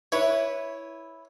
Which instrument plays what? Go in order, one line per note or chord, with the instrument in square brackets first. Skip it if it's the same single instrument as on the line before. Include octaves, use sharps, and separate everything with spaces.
[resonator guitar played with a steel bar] E4 B4 [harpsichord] C#5